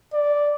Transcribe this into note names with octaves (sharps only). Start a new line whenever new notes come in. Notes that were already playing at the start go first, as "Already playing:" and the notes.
D5